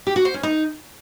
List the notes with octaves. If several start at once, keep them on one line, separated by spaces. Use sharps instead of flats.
G4
F#4
C5
C#4
D#4